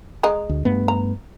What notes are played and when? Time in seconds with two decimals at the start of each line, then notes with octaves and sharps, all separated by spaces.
0.23 G#3 D#5 A#5
0.49 D2
0.65 G2 A3 B3
0.88 A#5